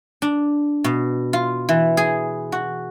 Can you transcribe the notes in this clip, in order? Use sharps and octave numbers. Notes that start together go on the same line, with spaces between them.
D4
B2
F4
E3
G#4
F#4